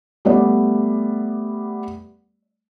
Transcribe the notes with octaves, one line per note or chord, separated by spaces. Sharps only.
G3 A3 B3 D5